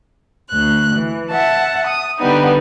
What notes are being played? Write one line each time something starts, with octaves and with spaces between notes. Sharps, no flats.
D2 F#6
E3
E5 F#5 A5
D#6
D3 G3 B3 D#4